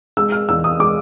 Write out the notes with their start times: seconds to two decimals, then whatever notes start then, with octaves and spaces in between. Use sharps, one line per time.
0.17 G#3 E6
0.32 F6
0.49 E2 E6
0.64 D#6
0.79 G#3 D6